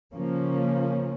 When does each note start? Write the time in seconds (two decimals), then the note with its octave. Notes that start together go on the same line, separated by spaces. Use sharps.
0.14 C#3 F3 A#3 C#4